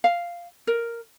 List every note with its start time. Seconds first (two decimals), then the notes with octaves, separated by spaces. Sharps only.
0.04 F5
0.67 A#4